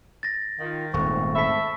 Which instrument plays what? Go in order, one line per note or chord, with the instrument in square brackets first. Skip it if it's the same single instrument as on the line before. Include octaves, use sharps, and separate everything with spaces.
[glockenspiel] A6 A#6
[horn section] D#3 [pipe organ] F4
[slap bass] D#1 [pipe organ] G#2 A3 C4 [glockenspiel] C#6
[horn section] A4 E5 [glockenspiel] B5 B6